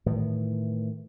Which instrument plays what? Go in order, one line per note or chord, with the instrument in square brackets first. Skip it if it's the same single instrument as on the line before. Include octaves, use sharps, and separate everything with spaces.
[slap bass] A2 D#3 E3